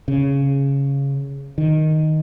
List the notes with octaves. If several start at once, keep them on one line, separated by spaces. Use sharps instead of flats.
C#3
D#3